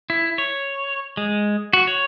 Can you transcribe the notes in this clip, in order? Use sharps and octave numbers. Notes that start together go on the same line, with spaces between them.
E4
C#5
G#3
F#4
C#5